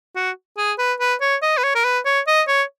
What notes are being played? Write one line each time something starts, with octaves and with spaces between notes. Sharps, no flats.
F#4
G#4
B4
B4
C#5
D#5
B4
C#5
A#4
B4
C#5
D#5
C#5